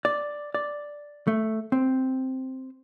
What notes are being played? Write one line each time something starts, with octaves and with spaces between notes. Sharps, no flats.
D5
D5
A3
C4